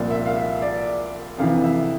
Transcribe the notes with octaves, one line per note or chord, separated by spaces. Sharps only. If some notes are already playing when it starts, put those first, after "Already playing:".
Already playing: C2 A#2 F3 D5
E5
F5
E5
D5
F2 C3 E3 F5
E5